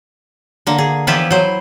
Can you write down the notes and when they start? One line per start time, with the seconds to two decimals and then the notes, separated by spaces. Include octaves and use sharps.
0.67 D3 A#3
0.78 G#4
1.07 E3 F3 B3 E4 F4 G4
1.31 F#3 C5